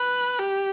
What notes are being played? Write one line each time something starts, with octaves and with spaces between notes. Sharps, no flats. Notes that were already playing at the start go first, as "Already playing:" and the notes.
Already playing: B4
G4